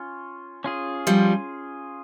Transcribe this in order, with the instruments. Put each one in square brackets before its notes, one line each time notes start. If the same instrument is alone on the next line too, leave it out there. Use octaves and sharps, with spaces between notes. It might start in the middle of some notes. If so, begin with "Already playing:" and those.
Already playing: [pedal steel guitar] C#4 F4
C#4 F4 G#4
[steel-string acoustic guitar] F3 G3